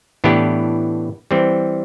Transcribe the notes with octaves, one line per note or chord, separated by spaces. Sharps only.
A2 E3 B3 D4 G4
E3 G3 C4